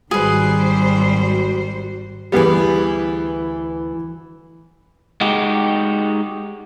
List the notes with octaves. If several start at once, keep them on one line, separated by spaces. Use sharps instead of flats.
G#1 D#3 G3 F#4 G#4 B4 C5
D2 E3 G3 B3 G#4
G#3 D#4 F#4 G4